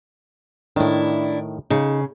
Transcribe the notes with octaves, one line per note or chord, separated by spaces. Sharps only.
A2 D#3 D4 E4
C#3 D#4